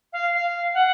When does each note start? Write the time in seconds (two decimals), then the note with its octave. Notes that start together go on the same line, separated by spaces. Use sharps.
0.12 F5
0.33 F5
0.73 F#5